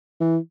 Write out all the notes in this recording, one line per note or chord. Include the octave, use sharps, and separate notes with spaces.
E3